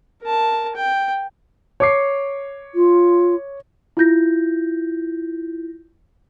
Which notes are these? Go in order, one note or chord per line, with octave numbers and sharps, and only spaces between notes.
A#4 A5
G5
C#5 D6 C7
F4
E4 F4 G6 A#6